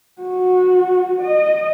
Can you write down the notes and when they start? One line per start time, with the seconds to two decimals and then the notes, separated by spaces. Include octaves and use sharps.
0.22 F#4
1.21 D#5